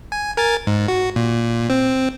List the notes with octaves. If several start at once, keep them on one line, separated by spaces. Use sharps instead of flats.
G#5
A#4 G#5 A6
G#2
F#4
A#2
C4